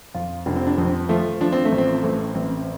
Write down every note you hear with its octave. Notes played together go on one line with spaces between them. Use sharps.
F2 F4
F1 D4
C4
D4
F2 C4
F3 A3
F3 D4
C4
A3
A1
C4
A1 A3
A1 C4